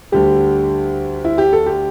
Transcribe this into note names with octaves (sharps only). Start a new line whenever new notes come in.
D2 D3 G3 G4
E4
G4
A4
G4